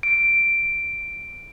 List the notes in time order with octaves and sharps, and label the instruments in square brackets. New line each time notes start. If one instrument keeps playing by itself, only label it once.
[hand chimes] D7